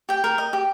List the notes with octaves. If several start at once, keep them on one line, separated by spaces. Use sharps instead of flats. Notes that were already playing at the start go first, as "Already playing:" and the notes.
G4 G5
A#4
D#5
G4